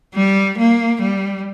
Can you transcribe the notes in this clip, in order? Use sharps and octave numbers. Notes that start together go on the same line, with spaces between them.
G3
A#3
G3